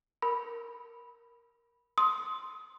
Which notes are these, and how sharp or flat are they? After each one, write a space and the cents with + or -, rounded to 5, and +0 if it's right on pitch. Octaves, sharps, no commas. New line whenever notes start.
A#4 +0 B5 -10
C6 +5 D#6 +25